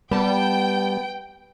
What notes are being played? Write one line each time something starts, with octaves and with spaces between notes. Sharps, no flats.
G3 B3 G5 A5